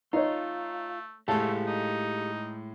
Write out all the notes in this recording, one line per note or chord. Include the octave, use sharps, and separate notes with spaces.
A3 D#4 F4 C#5
A2 G#3 A3 G4 A4 F5 A5
D#4